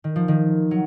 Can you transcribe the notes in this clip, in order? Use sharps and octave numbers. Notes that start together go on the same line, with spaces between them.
D#3
F3
D#3
F#3